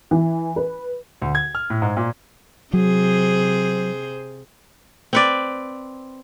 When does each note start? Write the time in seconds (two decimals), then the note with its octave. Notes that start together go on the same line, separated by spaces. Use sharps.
0.11 E3
0.56 B4
1.22 D2
1.35 G#6
1.55 F6
1.70 A2
1.82 G#2
1.97 A#2
2.73 C3 F#3 G#4 C5
5.13 C4 B4 D5